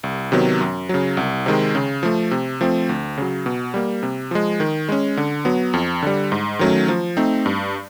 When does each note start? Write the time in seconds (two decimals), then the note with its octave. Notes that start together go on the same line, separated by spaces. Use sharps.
0.03 C2
0.32 C3 D#3 F#3 B3
0.61 F#2
0.89 C#3 F#3
1.17 C2
1.46 C3 D#3 G#3
1.75 C#3
2.03 F3 A3
2.31 C3
2.61 F3 A3 C4
2.89 D2
3.18 C#3 F#3
3.46 B2
3.74 G3 A#3
4.03 C3
4.31 F3 G#3
4.60 D#3
4.89 G#3 C#4
5.17 D3
5.45 F#3 B3
5.73 F2
6.03 D3 G3
6.32 G#2
6.59 D#3 F#3 A3 C#4
6.88 F3
7.17 A3 C4 D#4
7.46 G2